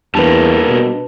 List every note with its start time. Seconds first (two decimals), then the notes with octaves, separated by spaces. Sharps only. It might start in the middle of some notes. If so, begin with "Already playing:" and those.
0.15 E2 G3 A#3 D4 B4 A5
0.68 B2